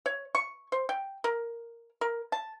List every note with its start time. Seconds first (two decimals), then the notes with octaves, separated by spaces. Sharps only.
0.06 C#5
0.35 C#6
0.72 C5
0.89 G5
1.24 A#4
2.01 A#4
2.32 A5